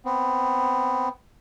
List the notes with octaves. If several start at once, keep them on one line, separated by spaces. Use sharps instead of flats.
B3 C4